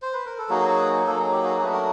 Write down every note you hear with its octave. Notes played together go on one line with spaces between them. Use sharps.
C5
B4
A#4
A4
F#3 A#3 D#4 F#4 G#4
F#3 A#3 D#4 A4
G#4
G4
F#4 G#4
F#3 A3 D4 F#4 B4
A#4